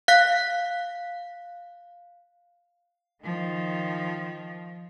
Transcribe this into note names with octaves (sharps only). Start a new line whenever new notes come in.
F5 F#6 B6
D#3 F3